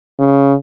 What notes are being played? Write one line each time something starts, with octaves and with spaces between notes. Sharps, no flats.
C#3